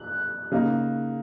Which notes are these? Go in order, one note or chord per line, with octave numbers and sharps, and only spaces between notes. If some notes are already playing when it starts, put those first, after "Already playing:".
Already playing: F#6
C#3 A#3 D#4